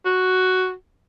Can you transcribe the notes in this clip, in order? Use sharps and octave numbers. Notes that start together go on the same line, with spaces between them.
F#4